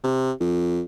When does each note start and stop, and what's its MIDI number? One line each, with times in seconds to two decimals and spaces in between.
0.04 0.32 48
0.40 0.81 41